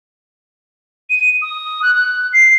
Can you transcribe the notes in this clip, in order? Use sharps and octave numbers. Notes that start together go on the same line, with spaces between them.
D#7
D#6
F#6
F#6
C7